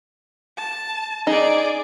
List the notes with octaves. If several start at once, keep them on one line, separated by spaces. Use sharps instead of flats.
A5
D#4 G#4 D5